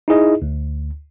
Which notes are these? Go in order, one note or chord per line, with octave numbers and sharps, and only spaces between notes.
D#4 E4 G#4 D#5
D2